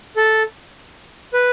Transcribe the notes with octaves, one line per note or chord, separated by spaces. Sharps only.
A4
B4